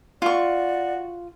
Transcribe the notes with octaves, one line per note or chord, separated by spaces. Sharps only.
F4 F#4 D5 C#6